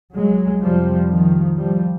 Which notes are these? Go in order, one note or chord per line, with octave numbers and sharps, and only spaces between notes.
F#3 G#3
F2 C3 F3 G3
D#3 F3
F3 G3